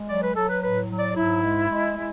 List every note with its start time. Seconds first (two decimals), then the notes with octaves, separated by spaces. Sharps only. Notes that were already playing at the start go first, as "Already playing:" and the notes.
Already playing: G#3
0.08 F#3 D5
0.22 B4
0.35 F#3 A4
0.49 B4
0.62 A2 B4
0.90 F#3
0.99 D5
1.16 G#2 E4
1.43 G#3
1.70 G#3
1.97 G#3